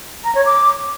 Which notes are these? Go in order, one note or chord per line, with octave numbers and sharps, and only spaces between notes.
A#5
C#5
D6